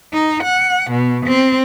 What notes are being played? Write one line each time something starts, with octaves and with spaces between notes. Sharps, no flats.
D#4
F#5
B2
C4